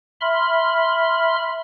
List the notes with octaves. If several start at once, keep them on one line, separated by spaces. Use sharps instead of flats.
E5 B5 C6 F6